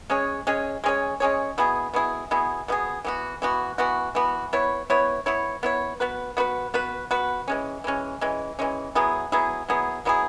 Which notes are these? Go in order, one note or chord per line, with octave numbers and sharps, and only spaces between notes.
G#3 C#4 G#4 C#5
G#3 C#4 G#4 C#5
G#3 C#4 G#4 C#5
G#3 C#4 G#4 C#5
B2 B3 E4 G#4
B2 B3 E4 G#4
B2 B3 E4 G#4
B2 B3 E4 G#4
E3 B3 F#4
E3 B3 F#4
E3 B3 F#4
E3 B3 F#4
B3 E4 C#5
B3 E4 C#5
B3 E4 C#5
B3 E4 C#5
B3 F#4 B4
B3 F#4 B4
B3 F#4 B4
B3 F#4 B4
E3 G#3 C#4
E3 G#3 C#4
E3 G#3 C#4
E3 G#3 C#4
F#3 B3 E4 G#4
F#3 B3 E4 G#4
F#3 B3 E4 G#4
F#3 B3 E4 G#4